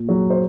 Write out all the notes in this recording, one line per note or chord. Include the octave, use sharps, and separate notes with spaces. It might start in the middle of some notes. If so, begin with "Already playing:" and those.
Already playing: A#2
F#3
C5